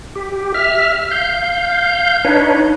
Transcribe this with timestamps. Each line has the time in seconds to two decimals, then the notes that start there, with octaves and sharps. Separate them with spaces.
0.15 G4
0.54 E5 F6
1.11 F5 G6
2.25 D4 D#4 B4 C#5